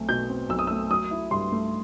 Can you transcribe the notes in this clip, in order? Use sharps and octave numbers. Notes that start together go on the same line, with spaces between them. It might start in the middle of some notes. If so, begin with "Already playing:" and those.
Already playing: B1 A3 C4
B2 G6
C4
B1 E6
D#6
A3 E6
F#3 D#6
E4
G2 C6
A3